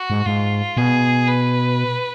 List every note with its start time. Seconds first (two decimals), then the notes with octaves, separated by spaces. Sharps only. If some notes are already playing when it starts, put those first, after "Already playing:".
Already playing: F#4
0.10 G#2
0.26 G#2 F4
0.77 B2 G#4
1.28 B4